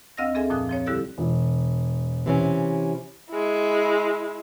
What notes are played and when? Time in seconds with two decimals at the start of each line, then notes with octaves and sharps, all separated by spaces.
0.17 D2 C4 D#5 F5 E6 A#6
0.35 C4 G#4 A4 E5 G#5
0.50 F2 A#2 F3 D#6 F#6
0.69 F3 C4 C#5
0.86 D3 G3 E4 G4 A4 D5
1.18 E1
2.26 C3 E3 C#4
3.30 G#3 E4